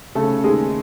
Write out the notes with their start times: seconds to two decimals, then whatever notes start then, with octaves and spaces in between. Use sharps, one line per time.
0.15 C#3 A3 A4
0.44 D#2 G#3 G#4